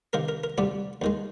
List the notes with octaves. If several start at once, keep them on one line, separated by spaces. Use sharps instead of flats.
C3 D#3 A#3 A#4
A#4
A#4
D2 C3 G3 G4
D#2 D#3 G#3